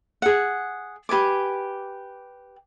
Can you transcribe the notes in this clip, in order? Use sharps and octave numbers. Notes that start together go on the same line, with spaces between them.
G#4 F#5
G4 B4 G#5 D6